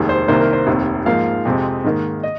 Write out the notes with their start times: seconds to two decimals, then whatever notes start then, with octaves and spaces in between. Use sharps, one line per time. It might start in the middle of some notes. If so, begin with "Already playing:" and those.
Already playing: F1 D#2 D#3 G#3
0.09 C5
0.28 C2 C3 D#3 A#3 C5
0.40 A#4
0.53 C5
0.67 F1 D#2 D#3 C4
1.06 G#2 F3 A#3 F5
1.45 F2 C3 G#3 C4
1.84 G#2 D#3 A#3
2.23 D#5